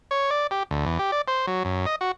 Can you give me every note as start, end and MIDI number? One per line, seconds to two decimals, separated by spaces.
0.11 0.30 73
0.31 0.47 74
0.51 0.63 67
0.71 0.85 38
0.85 0.98 40
0.99 1.11 67
1.12 1.22 74
1.28 1.46 72
1.47 1.63 54
1.65 1.86 42
1.86 1.96 75
2.01 2.12 66